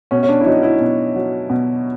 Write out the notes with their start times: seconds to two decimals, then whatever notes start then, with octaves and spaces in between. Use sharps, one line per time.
0.11 B2 C#4
0.23 C#4
0.29 D4
0.41 E4
0.46 F#3 D#4
0.63 E4
0.81 B2
1.15 F#3
1.50 B2